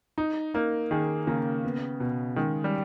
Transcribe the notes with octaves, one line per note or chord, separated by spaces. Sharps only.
D#4
A#3 D#4
D#3 G#4
C#3 A#3
B3
B2
D#3 G#3
G3